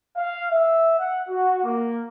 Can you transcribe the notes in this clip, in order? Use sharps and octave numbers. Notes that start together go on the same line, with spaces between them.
F5
E5
F#5
F#4
A#3